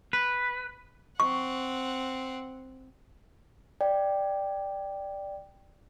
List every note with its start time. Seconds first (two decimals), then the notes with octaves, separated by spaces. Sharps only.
0.13 B4
1.20 C4 F#5 C#6
3.81 D5 G5